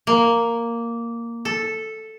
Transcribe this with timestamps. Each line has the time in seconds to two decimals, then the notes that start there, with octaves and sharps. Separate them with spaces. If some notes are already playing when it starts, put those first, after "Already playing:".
0.07 A#3
1.45 A4